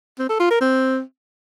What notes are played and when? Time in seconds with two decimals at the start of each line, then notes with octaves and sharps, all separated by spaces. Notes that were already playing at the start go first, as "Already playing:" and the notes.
0.19 C4
0.29 A4
0.40 F4
0.50 A#4
0.61 C4